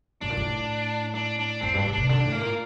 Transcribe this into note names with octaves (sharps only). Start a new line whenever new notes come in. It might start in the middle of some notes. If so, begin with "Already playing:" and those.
A2 D4
A#2
A2
D4
D4
F2 C4
G2 D4
A2
C3 D4
D3 D4
A2
A#3
A#2